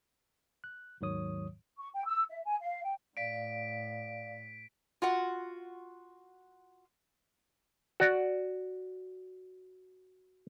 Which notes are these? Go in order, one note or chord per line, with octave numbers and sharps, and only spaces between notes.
F#6
D#2 G#2 D#3 F#3 C#5 D#6
C#6
G5
E6
E5
G#5
F5
G5
A2 D5 F5 B6 D7
F4 F#4 F#5
F#4 D5